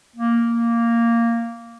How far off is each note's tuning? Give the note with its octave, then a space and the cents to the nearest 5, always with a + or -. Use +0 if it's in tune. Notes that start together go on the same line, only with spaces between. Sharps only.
A#3 -5